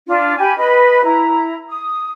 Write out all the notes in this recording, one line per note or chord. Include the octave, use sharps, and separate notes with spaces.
D4 F4
G4 G#5 B5
B4 D#5 B5
E4 A#5
D#6